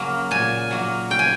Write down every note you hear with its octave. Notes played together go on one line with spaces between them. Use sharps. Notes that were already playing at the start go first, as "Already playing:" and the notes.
Already playing: C#3 F#3 A#3
A#2 G#5
F#3 A#3
C#3 G5
G#5